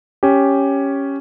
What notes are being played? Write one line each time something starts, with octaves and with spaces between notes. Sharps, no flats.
C#4 G4